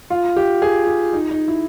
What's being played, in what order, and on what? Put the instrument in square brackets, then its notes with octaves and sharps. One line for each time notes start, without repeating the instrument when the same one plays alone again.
[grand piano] F4
G4
G#4
G4
D#4
D#4
E4